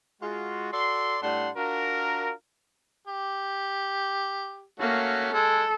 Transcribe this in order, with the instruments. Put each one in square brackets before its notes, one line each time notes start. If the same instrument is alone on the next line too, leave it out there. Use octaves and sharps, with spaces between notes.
[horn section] G#3 F4 F#4
F#4 A4 D5 C6
A2 G3 D4 F#5 A5 C6
D4 F4 F#4 A#4
[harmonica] G4
[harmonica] A3 C#4 F#4 [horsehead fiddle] A#3
[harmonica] G#3 [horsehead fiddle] A4